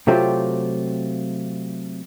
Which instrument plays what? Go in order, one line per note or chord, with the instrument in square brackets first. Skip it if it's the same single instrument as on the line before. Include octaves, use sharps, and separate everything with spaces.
[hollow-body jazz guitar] C3 F#3 A3 C4 F4 G4